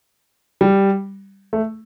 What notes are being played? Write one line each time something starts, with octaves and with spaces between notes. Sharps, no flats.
G3
A3